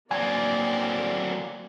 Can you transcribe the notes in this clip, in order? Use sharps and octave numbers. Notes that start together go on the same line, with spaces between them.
F#3 A#3 C4 D5 G#5